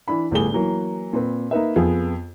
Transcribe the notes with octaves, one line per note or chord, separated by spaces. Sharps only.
E3 D4 E4 B5
G1 A2 G3 G4 G#4 G7
E3 F#3 A#3
A#2 C4 B4
A#3 D#4 B4 E5
F2 B3 F4 G#4